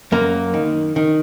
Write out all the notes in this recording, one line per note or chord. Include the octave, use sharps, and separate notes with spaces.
F#2 A#3
D#3
D#3